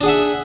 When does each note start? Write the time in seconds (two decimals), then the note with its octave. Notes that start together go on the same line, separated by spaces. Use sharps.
0.01 D4
0.03 G#4
0.06 F#5
0.08 E5